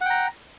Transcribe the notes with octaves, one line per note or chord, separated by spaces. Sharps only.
F#5 G5 A#5